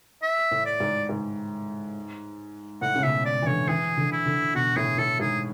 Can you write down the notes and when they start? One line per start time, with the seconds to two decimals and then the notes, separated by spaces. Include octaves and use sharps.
0.23 E5
0.51 A2
0.66 D5
0.80 G#2
1.09 G#2
2.82 A2 F#5
2.96 C#3
3.03 B2 E5
3.25 D5
3.42 E3
3.47 D3 C#5
3.69 E3 G#4
3.97 D3
4.12 E4
4.26 D3
4.55 B2 F#4
4.76 A2 G#4
4.98 A2 A4
5.20 G#2 G#4